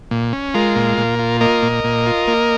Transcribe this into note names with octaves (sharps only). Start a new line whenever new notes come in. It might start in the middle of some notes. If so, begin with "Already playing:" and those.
A#2
C#4
G#3 F4 A#4
A#2
A#2
F4
A#3 A#4 D#5
A#2
A#2
F4
A#3